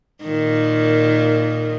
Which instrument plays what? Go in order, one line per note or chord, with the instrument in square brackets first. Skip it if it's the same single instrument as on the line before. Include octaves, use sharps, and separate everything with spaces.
[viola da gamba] A#2 D#3